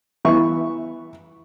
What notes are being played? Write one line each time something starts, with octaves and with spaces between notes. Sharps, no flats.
E3 B3 E5 C#6